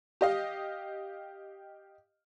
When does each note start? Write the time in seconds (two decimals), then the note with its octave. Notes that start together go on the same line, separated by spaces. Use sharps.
0.21 G4 D#5 F5